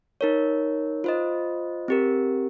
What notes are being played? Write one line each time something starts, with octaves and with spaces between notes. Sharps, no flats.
D#4 A#4 C#5
F4 C5 D#5
C4 G4 A#4